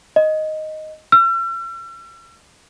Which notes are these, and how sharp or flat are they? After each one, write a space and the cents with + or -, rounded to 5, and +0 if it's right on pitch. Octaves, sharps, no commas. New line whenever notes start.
D#5 +0
E6 +45